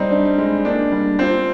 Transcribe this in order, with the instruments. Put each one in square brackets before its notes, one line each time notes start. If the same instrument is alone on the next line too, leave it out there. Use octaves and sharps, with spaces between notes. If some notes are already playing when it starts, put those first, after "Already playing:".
Already playing: [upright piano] G3 [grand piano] C4 D#4
[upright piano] D4
G#3
[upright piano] A#3 [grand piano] D4
[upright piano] G3
[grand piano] C4 [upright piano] F4